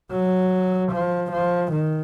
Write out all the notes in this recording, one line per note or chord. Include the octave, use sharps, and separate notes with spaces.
F#3
F3
F3
D#3